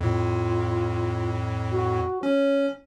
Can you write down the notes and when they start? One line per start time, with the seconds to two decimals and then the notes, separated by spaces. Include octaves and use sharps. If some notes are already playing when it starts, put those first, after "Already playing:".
0.01 F2 A2 F4
1.72 F#4
2.23 C#4 C#5